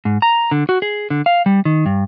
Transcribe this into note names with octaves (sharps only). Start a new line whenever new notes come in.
G#2
A#5
D3
F#4
G#4
D3
F5
G3
D#3
G2